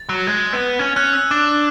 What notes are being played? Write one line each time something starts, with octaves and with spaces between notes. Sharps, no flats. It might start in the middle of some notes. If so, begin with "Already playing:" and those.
Already playing: A6
F#3
G#3
B3
C#4 G#6
C#4 F#6
E6
D4 D6